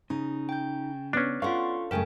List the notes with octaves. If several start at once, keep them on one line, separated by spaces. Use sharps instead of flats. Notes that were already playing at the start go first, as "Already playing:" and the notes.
C#3 D#4
G5 G6
B3 C#4 D4
F4 A4 D5 F5 F#5 C6 C#6
F#2 C#3 A3 A#4 G5 G#5